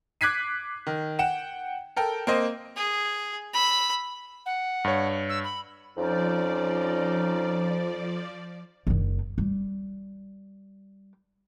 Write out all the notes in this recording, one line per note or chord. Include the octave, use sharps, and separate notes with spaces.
D6 F#6 G#6 B6 C7 D#7
D#3
F#5 G5 E7
A4 A#4 G5
A#3 C4 C5 D#5
G#4
B5 E6
F#5
G2 C#5
E6
B5
F2 F3 C#4 D#4 D5
F#1 D#3
G3